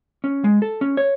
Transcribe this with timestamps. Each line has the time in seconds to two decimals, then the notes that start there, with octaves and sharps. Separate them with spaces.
0.24 C#4
0.44 G#3
0.62 A4
0.81 C#4
0.97 C#5